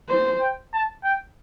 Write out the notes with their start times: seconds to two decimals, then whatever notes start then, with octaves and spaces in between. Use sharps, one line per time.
0.09 C5
0.40 G5
0.73 A5
1.04 G5